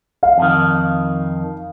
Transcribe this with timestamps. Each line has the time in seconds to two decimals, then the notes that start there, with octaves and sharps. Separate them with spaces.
0.23 F5
0.38 F2 D#3